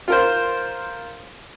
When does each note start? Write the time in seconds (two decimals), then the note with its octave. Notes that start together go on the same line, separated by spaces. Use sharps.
0.08 F4 A#4 C5